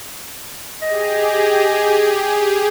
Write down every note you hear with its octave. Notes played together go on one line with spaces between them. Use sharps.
G4 G#4 D#5